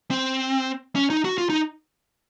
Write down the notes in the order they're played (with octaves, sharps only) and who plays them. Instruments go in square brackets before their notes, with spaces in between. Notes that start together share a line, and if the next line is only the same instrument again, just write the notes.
[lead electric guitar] C4
C#4
D#4
F#4
F4
D#4